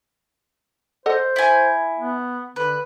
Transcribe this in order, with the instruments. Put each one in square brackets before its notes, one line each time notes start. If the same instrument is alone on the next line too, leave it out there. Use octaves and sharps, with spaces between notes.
[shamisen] A4 D#5 F#5 [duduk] C5
[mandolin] E4 G#5
[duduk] B3
[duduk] D3 [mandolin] B4